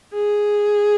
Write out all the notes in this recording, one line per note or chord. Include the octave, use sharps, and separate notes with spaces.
G#4